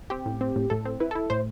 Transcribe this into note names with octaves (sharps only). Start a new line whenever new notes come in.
C4 G4
A2
C4
A2
A2 A4
C4
E4 B4
E4 A4
A2 C5